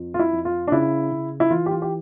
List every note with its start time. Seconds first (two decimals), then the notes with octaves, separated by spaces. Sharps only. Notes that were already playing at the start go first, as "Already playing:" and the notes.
Already playing: F2
0.14 F4
0.19 E4
0.33 F2
0.45 F4
0.67 D4
0.72 C#3 E4
1.12 C#3
1.40 E4
1.50 E3 F4
1.66 G4
1.71 F4
1.82 G4